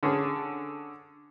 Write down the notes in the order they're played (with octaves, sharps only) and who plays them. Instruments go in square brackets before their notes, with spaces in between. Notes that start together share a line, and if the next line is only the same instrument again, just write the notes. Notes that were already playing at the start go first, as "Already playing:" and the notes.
[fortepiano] D3 C#4 G#4